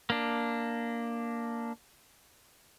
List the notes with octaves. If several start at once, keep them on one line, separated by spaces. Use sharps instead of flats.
A#3 D4